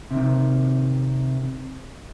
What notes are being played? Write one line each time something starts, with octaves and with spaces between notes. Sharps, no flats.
C3 D#3